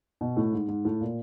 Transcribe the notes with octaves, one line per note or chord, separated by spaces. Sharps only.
B2
A2
G#2
G#2
A2
A#2